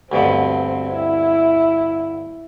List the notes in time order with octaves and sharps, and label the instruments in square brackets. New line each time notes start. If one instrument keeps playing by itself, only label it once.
[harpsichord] D2 G2 B2 [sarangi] C4
[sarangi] E4